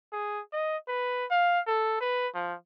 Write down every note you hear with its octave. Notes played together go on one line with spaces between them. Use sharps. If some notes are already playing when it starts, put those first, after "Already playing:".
G#4
D#5
B4
F5
A4
B4
F3